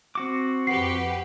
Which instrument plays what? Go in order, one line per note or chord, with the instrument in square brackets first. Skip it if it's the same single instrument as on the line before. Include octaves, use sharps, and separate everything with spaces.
[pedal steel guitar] C4 F#4 D6
[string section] F2 G4 B4 [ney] F#5 [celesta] C7